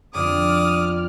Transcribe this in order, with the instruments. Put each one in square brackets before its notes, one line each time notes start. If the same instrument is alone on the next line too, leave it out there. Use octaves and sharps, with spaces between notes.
[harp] F2 D3 B3 [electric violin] D5 F6 [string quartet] D6 [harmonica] D#6